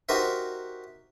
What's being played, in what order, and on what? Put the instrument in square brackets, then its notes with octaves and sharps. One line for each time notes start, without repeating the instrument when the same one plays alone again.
[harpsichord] D#4 F#4 G4 A#4 C5 E5